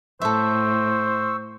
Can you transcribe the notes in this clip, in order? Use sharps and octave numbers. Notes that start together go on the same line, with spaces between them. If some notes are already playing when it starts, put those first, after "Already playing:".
A2 A4 C5 E5 C#6 E6